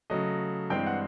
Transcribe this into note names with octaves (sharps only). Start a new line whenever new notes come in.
C#3 F#3 A3 D#5
G2 E3 G#3 C4 G5
F#5